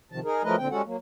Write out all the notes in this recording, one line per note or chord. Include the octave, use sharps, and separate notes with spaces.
C3 D#3 F3 A5
D#4 G#4 A#4
F3 F#3 A3 A#4 B4 D#5
A#2 D3 C4 G5
G3 G#3 C#4 F#4 A4 F#5
F#3 A#3